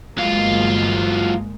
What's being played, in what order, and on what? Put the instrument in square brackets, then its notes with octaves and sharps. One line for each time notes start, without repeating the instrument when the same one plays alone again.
[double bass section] G1 G#3 A#3 [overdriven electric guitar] F#3 F4